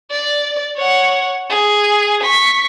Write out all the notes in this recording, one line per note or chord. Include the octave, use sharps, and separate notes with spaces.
D5
C#5 F#5
G#4
C#6 B6